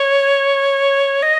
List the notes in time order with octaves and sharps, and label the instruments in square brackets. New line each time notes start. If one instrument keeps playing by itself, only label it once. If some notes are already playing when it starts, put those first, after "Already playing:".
Already playing: [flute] C#5
D#5